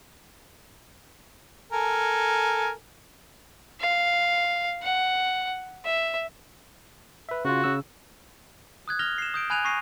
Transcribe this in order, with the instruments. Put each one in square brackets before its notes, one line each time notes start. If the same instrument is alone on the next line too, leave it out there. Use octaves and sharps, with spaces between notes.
[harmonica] A4 A#4 G#5
[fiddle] F5
F#5
E5
[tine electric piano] B4 E5
[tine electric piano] C#3 F4 [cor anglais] F#4
[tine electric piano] C#3 E6
[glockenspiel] D#6 F#6 G#6
F6 A#6 F7 G7
C7 E7
D#6 G6 D7
G#5 B5 F#6 G#6 D#7 F7
C#6 D#6 A#6 C7 D#7